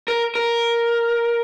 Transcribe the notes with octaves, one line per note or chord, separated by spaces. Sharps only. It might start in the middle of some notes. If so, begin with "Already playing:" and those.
A#4
A#4